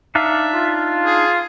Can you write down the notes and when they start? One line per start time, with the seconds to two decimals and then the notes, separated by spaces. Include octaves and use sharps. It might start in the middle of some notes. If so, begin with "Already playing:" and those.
0.15 D4 D#4 E5 F5
0.54 F4
1.05 G#4